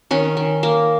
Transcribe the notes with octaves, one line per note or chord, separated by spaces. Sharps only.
D#3 C#4
D#3
A#3